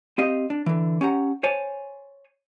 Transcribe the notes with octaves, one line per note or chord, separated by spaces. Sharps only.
C4 G4 D#5 F5
D4
D3 E3
C#4 G4 F#5 A#5
C5 C#5 G#5 A5